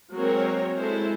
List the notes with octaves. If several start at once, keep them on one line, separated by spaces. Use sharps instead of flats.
F#3 G#3 A#3 C4 A#4 C#5
G#3 E4 A4 C5